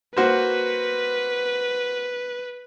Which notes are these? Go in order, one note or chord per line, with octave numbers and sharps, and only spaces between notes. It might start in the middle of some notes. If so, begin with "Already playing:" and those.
A#3 F#4 B4 C5